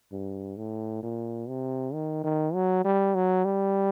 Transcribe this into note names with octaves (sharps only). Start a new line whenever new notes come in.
G2
A2
A#2
C3
D#3
D#3
F#3
G3
F#3
G3